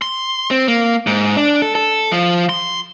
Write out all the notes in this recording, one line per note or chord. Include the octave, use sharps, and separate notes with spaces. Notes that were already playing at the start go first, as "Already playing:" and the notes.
C6
C4
A#3
G#2
D4
A4
A4
F3
C6